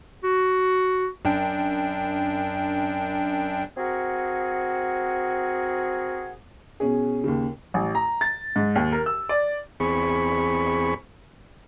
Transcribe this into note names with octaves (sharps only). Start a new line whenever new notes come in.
F#4
F#2 D4 G5
C4 F#4 G#4 A#4 F#5
B2 C#4 G#4
D#2 C#3
A1
A#5
A6
G#2
D#2
A#4
E6
D5
E2 C4 G#4 B5 C#6